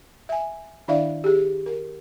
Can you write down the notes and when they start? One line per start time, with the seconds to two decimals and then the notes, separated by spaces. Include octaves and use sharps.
0.29 E5 G#5
0.88 D#3 D4 E4 D5 E5 F5
1.24 G4 G#4
1.66 A#4